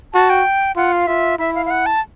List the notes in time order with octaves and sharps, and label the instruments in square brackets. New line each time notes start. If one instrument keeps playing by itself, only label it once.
[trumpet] F#4 [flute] A5
[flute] G5
[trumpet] F4 [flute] F#5
[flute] F5
[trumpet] F4 [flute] E5
[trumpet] E4 [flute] E5
[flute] F5
F5
F#5
A5